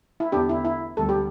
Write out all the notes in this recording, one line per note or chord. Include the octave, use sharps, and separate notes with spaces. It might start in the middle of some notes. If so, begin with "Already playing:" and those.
E4
E2 D3 B3 D4 G4
E4
E4
D2 D3 G3 B3 A4
G4